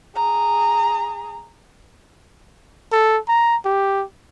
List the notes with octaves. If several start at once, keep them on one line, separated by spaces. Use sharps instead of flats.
G#4 A#5
A4
A#5
G4